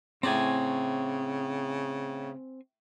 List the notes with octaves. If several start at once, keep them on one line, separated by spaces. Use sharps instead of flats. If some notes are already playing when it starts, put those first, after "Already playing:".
A2 C#3 C4 D5 G#5 A#5